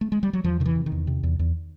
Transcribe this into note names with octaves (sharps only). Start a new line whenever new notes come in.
A3
G#3
G3
F#3
E2 F3
C3 D#3
E3
C3
D#3
E2
C3
E2
E2